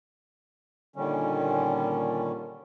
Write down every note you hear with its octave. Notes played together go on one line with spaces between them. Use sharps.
A#2 D3 D#3 G3 C#4